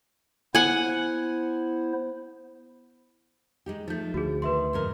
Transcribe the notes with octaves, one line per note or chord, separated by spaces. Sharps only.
B3 E4 C5 F#5 G#5
G#3 D#4 G4
F3 A3 D#4 G6
D2 F#4 G#4
D#3 B4 E5 C6
F2 G#2 A#4